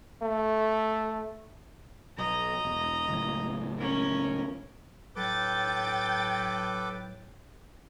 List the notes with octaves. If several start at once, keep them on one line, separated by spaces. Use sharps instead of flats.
A3
B1 D#5 A#5
E1
C#2 F#2 A2
C#4 A#4
A2 F#3 A4 B4 G5 D6 G6 A6